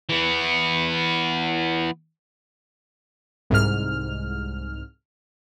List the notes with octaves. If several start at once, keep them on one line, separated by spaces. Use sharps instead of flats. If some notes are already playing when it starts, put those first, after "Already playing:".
E3 B3
C2 G#2 F6